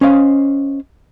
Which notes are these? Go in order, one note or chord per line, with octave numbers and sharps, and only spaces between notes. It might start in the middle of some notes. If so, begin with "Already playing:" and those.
C#4 C5 D#5 F5